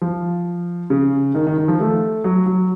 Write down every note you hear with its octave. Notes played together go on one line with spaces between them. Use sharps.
F3
C#3
D#3
D#3
D#3
F3
A3
F#3
F#3